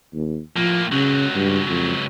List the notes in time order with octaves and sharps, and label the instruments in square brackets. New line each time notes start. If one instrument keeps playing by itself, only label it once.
[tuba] D#2
[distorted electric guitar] A2 A#3 [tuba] F3
[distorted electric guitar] C#2 F#3 [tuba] C#3
[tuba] G2
F2